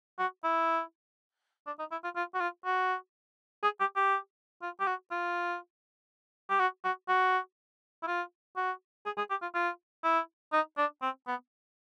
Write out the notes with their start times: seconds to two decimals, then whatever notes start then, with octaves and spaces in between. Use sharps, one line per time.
0.19 F#4
0.44 E4
1.66 D4
1.79 D#4
1.91 E4
2.04 F4
2.16 F4
2.34 F#4
2.40 F4
2.65 F#4
3.63 G#4
3.80 G4
3.96 G4
4.62 F4
4.80 G4
4.87 F#4
5.11 F4
6.50 G4
6.59 F#4
6.84 F#4
7.08 F#4
8.03 E4
8.07 F4
8.56 F#4
9.06 G#4
9.17 G#4
9.30 G4
9.42 F4
9.54 F4
10.04 E4
10.53 D#4
10.78 D4
11.02 C4
11.27 B3